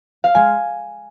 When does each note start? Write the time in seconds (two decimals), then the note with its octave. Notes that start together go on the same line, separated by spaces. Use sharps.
0.24 F5
0.35 G#3 G#5